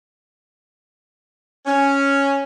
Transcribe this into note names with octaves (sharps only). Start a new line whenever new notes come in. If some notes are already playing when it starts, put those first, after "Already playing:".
C#4